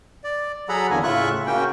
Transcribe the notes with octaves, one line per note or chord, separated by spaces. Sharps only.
D5
F#3 G#4 A4 F#5 A#5 B5
E2 D3 A#3 G#5
A2 C#3 F4 E5 C#6 F#6
C#3 A#3 C#4 F#4 G5